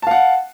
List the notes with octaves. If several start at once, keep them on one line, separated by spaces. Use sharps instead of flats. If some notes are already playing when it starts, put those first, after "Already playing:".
F5 F#5 A5